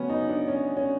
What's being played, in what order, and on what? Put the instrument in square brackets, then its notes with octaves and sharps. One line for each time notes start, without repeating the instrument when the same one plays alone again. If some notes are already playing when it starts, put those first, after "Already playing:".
Already playing: [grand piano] C#3 F#3 A3 B3 C#4
D#4
D4
C#4
C#4